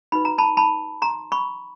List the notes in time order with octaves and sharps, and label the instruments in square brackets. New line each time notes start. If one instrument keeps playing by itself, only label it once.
[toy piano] D#4 F#4 B4 B5
A#5
A5 B5
A5 B5
A#5 C6
B5 C#6